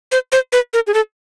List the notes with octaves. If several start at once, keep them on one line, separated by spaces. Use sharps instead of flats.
C5
C5
B4
A#4
G#4
A4